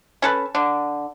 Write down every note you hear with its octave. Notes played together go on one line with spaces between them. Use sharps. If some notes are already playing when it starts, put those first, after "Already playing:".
C#4 A4 B4
D3